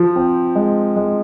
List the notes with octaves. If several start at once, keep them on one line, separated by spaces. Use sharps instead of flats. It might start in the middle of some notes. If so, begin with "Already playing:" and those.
Already playing: F3
C4
G#3
G#3